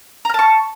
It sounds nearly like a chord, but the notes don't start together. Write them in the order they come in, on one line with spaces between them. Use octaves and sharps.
A#5 F6 A5 C#6